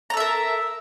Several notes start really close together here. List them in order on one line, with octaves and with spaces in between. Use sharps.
A#5 A4 E5 A#4